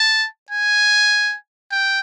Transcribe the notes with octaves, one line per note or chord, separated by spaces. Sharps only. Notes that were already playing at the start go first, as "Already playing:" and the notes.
Already playing: A5
G#5
G5